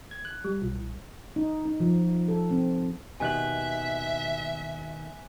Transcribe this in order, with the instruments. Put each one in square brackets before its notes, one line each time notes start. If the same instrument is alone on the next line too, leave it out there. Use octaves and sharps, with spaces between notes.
[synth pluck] G#6
F#6
G3
B1
A#1
[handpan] D#4
D#4
F3
A4
C4
[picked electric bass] D#2 B2 D#3 [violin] E5 [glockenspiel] G#5 F#6 F#7